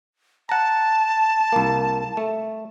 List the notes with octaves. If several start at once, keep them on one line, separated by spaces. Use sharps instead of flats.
F#5 A5 A#5
C2 A#3
A3